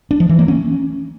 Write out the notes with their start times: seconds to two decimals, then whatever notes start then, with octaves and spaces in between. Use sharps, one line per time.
0.11 D4
0.20 F3
0.29 E3
0.39 A#3
0.48 C#4